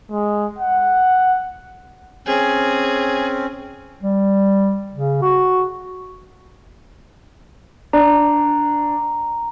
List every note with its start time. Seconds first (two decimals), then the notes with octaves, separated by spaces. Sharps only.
0.10 G#3
0.59 F#5
2.27 C4 C#4 G#4
4.03 G3
4.94 C#3
5.22 F#4
7.93 D4 A#5